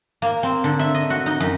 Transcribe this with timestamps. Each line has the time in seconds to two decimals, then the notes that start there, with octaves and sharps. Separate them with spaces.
0.22 A#3
0.43 C4
0.64 D3
0.79 E5
0.94 D#5
1.10 F#4
1.26 D#4
1.40 F#2